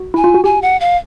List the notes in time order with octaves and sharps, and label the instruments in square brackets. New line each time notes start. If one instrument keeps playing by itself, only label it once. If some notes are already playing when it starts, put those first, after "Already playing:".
Already playing: [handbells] F#4
[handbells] E4 [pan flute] G#5
[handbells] F4
F#4
[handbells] G4 [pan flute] G#5
[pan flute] F#5
F5